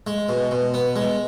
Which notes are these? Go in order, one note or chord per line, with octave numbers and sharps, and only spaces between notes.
G#3
B2
B2
B3
G#3